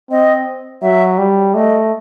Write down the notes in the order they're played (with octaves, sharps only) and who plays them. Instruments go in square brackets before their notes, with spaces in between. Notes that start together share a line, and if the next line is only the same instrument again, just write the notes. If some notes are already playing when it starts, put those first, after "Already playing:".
[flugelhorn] C4 [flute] D#5
[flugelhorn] F#3 [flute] E5
[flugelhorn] G3
[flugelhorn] A3 [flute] D#5